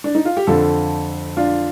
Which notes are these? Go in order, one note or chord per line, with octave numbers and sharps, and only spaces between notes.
D4
D#4
F4
G4
F2 D3 F3 F4 A4
D4 F4